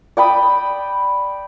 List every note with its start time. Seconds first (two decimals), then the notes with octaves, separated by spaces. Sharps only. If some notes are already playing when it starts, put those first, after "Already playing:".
0.17 D5 G5 B5 D#6